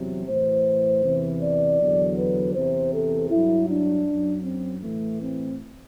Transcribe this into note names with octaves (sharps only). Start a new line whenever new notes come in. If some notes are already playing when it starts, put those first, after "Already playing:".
Already playing: E2 C3 F#3
A2 E3 C5
E2 C3 E3
D5
E2 D3 F#3
B4
E2 C3 E3 C5
A4
G2 F#3 E4
D4
F#2 F#3
C4
A2 E3 A3
C4